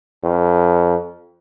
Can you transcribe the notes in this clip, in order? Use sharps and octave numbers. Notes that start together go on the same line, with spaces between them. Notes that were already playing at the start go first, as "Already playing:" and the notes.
F2